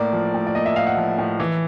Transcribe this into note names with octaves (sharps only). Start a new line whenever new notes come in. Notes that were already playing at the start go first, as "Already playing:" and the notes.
Already playing: A2 A#3 D5
F3
A2
D5
A#3 D#5
E5
A2 F5
F#5
F3
A2
E3